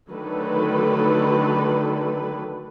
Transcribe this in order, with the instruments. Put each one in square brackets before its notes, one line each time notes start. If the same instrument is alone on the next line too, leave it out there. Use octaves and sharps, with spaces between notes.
[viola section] D3 D#3 F#3 A3 A4 B4